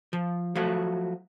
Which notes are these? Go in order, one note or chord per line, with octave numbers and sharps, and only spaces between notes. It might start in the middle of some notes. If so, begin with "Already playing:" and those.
F3
F3 F#3 A3 F#4